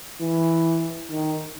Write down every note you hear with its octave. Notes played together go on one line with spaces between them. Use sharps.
E3
D#3